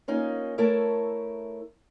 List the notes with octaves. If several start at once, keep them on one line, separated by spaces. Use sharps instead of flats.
A#3 C#4 D#4 F4
A3 E4 A4 A#4 C#5 E5